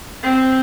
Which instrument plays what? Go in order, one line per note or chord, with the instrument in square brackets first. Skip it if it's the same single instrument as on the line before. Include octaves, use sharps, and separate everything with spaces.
[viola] C4